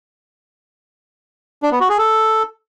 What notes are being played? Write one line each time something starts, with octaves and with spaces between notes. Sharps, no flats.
D4
B3
F#4
G#4
A4